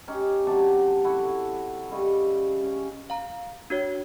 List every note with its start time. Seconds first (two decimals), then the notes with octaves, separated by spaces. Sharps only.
0.08 C#4 D#4 G4
0.47 C3 F#3 D5 A5
1.04 E4 F#4 A4
1.91 C#3 G3 D#5 C#6
2.63 C#4
3.10 F5 A#5
3.70 D4 F#4 C#5